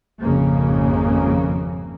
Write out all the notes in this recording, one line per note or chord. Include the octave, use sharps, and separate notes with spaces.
G#1 F2 C#3 A#3